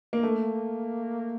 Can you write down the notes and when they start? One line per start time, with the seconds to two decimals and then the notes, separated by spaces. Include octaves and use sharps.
0.13 A#3
0.23 A3 A#3